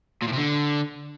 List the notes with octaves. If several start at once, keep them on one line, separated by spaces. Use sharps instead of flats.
A#2
A2
C3
D3